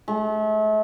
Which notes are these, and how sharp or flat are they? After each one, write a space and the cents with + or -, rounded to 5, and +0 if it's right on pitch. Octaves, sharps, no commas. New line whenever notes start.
A3 -40